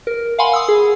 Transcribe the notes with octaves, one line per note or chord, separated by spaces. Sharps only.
A#4
F5 F#5 G#5 B5 C6
D#6 E6
G#4